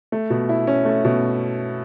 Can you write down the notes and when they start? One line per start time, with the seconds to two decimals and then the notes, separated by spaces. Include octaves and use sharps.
0.12 A3
0.30 B2
0.49 E4
0.67 C#4
0.85 A3
1.04 B2